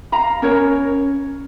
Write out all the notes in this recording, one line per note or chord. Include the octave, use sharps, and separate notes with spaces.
F5 A#5 B5
C#4 A#4 C#5